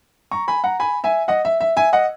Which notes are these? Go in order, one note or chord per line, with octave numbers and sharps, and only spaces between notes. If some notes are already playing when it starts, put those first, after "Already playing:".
A#5 C#6
G#5 B5
F#5 A#5
G#5 B5
E5 G#5
D#5 F#5
E5
E5
E5 G#5
D#5 F#5